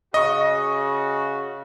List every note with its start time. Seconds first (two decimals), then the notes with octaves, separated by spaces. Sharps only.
0.14 C#3 F#4 D#5 C#6